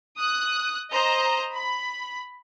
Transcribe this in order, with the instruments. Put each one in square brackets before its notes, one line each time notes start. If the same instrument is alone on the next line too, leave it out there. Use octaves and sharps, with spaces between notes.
[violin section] D#6 F#6
C5 D#5 A#5
B5